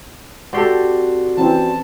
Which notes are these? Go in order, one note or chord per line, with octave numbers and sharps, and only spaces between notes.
C4 F#4 G4 A4 D5 C6
E3 C4 C#4 A5